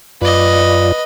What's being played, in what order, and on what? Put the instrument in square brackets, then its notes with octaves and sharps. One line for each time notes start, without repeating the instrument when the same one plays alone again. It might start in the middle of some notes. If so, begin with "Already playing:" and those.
[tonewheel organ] F#2 F4 D5 [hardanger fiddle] B4 D#5